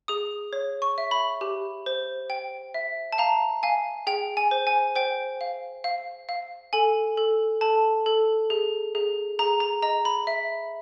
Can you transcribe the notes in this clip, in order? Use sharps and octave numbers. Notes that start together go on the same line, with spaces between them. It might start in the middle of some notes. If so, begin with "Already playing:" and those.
G#4 D#6
C#5
C#6
E5
B5
G4
C5
G5
E5
A5
F5 A#5
F5 G#5
G#4 G5
G#5
C5
G#5
C5 G5
F5
F5
F5
A4 G#5
A4
A4 A5
A4
G#4
G#4
G#4 A#5
A#5
D#5 A#5
B5
E5